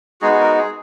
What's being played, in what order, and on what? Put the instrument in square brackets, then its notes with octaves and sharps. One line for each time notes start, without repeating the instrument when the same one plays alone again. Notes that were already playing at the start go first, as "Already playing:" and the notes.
[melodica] G#3 B3 D#4 F#4 G#4
G#4
A#4
G#4